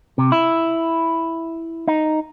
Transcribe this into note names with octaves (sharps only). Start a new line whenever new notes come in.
C3
E4
D#4